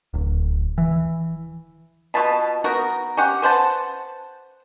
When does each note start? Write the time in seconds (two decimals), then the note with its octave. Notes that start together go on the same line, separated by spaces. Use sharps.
0.14 D1
0.78 E3
2.14 B2 F4 A5 B5
2.64 B3 D#4 F#4 A#4
3.17 C#4 G4 F#5
3.42 B4 C5 F#5 A5